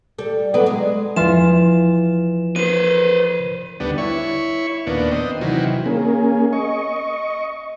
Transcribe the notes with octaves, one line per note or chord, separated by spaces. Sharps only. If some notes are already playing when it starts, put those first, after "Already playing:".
G3 A4
F#3 B3 D4
G#3
E2 E3 F3 F4 E7
B4 C5 D#7
D2 G3 B3 D4
E4 C#5 C#6
D#2 A#2 B3 D4
C4 D#5
C3 D#3 E3 F#3
A#3 C#4 G#4
D#5 C#6